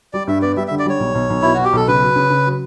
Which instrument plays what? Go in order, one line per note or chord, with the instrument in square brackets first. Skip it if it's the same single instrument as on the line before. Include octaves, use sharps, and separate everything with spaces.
[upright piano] G3 [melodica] D5
[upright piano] G2 [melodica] E5
[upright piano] B3 [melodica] D5
[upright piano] G3 [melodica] E5
[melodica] E5
[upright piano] D3
[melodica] D5
[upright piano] G3 [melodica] C#5
[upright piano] B1
B1
B1
[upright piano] B2 [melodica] E4
[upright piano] B2 [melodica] F#4
[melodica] G4
[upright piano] B1 [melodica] A4
[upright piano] C#3 [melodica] B4
[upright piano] F#3
C#3
C#3
F#3